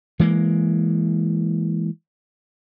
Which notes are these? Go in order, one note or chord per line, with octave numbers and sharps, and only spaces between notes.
E3 G#3 A#3